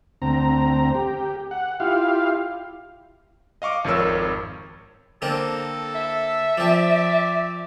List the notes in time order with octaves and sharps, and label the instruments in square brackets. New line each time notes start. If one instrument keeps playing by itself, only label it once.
[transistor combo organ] D2 C4 A#5
G4
F#5
E4 F4 G4 F5
[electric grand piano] D#5 F5 C#6 D6
G#1 F2 A#4 C#5 E6
[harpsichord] D3 A#3 C4 [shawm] A4
[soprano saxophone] E5
[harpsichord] F3 C4 [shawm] D5